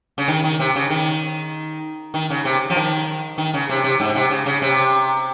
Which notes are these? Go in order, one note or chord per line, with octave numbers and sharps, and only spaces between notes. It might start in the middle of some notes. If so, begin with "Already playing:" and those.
C#3
D#3
D#3
C3
C#3
D#3
D#3
C#3
C3
F3
D#3
D#3
C#3
C3
C3
G#2
C3
C#3
C#3
C3